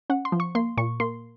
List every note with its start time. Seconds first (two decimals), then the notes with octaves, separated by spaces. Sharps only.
0.10 C#4 F#5
0.25 C6
0.32 F3
0.40 C#6
0.55 A#3 C6
0.77 A#2 C#6
1.00 A#3 C6